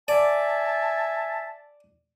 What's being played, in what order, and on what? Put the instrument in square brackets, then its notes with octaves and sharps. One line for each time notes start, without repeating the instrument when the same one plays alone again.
[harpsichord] D5 [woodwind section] E5 G#5 A5